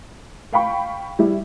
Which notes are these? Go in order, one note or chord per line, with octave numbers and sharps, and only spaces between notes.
F5 G5 B5 C#6
G3 E4